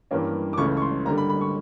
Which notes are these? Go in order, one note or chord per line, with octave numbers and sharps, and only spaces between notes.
G2 E3 G3 A#3 C#4
D6
C#2 C#3 E3 A3 C#6
C#6
C6
D3 G3 A#3 A#5
B5
B5
C#6